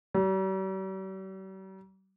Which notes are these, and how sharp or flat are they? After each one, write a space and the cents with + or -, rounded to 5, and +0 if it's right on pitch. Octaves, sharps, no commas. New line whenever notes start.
G3 -45